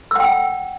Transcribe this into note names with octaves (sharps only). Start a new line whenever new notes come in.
F#5 G5 E6